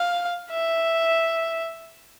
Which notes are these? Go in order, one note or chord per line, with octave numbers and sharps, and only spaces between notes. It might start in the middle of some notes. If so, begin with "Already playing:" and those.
Already playing: F5
E5